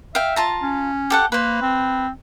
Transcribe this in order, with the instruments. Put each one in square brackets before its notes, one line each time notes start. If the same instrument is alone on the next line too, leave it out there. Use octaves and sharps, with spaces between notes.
[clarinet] E5 [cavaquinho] F5 G5
[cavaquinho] F4 A5 A#5
[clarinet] C#4
[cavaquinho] G4 A4 F#5
[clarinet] A#3 [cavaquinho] B4 C5
[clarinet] C4